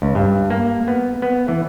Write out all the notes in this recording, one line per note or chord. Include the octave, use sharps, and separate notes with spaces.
C#2
G2
A#3
B3
B3
E3